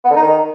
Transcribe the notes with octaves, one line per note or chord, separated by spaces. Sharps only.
B3
D3
D#4
D#3